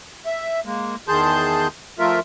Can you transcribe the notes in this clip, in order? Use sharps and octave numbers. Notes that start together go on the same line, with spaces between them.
E5
G#3 A#3
E2 D#3 G#4 A5 C6 G6
F3 A3 F4 A#4 E5